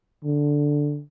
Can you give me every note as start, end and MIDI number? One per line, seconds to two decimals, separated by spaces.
0.25 1.02 50